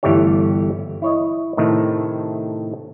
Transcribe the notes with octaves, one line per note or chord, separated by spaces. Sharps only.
G1 E3 G3 A3 G4 C#5
E4 C#5 D#5
A2 C3 D#3 A3